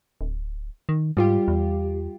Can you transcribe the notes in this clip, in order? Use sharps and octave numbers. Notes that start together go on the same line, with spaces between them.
D1
D#3
G#2 G3 F4 G4
E2